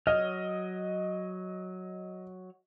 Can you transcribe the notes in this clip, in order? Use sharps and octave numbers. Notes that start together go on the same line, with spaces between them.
F#3 C#5 D#5 F6